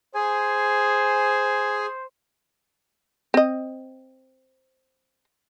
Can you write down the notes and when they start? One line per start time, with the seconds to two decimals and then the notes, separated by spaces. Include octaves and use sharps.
0.15 G#4 C5 G#5
3.34 C4 D#5